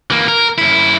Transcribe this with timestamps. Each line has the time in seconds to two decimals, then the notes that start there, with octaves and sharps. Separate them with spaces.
0.10 E3 A#3
0.28 A#4
0.58 F#2 E4